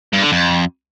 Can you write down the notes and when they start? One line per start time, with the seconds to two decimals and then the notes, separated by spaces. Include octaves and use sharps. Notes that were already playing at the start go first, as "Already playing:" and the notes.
0.13 G2
0.22 D3
0.32 F2